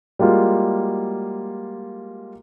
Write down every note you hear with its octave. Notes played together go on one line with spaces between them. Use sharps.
G3 G#3 A#3 F4 F#4